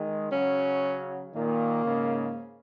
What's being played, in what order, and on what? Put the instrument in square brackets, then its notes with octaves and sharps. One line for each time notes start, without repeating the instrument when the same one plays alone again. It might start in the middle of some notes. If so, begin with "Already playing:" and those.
Already playing: [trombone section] D#3 G#3
[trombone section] C#3 F#3 [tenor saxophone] C#4
[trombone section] A#2 D#3 [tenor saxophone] A#3
[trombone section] G#2 C#3